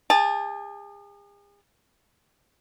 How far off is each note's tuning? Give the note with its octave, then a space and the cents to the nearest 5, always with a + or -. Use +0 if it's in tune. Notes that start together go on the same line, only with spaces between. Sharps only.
G#4 -40 A5 +0